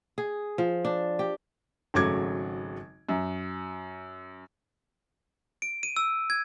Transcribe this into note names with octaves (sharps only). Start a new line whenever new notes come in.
G#4
F3
D4
G4
G#1 C#3 F#3 A3 D6 G#6
F#2
D7
D#7
E6
G#6